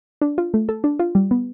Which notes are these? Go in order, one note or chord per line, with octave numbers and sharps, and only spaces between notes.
D4
F4
A3
A4
D4
F4
G3
B3